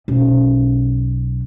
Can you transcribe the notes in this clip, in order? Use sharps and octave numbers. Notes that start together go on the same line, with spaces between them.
B1 C#4